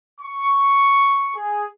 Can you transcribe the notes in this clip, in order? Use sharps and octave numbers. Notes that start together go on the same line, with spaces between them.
C#6
G#4